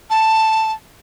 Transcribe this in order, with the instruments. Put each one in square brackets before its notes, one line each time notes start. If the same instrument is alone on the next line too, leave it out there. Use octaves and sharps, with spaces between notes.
[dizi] A5